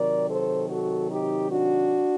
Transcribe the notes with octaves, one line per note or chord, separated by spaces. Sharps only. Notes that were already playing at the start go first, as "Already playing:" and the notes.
Already playing: C3 D#3 F#3 A#4 D5
A4 C5
F#4 A4
D#4 G4
D4 F#4